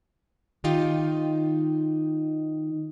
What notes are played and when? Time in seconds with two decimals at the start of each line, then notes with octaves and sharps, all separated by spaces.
0.64 D#3 D#4 F4 G4 G5